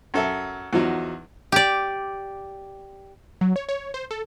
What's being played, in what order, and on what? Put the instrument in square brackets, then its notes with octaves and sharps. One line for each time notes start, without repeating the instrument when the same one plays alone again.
[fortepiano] F#2 A4 E5
E2 F3 F#3 D#4
[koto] G4 D5
[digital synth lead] F#3
C#5
C#5
C5
A4